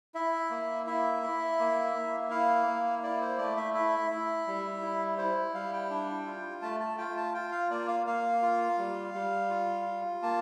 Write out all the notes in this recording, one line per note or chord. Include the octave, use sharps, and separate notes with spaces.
E4 E5
A#3
E4 E5
E4
A#3
A#3
E4 F5
A#3
E4 D5
C5
A3 D5
E5
E4 E5
E4
G3
E4
E4 C5
G3 F5
G5
D4
F4
A3 A5
A5
F4 G5
A5
F4 G5
F5
A#3 D5
F5
A#3 F5
F4
G3
G3
F4
F4
A#3 A5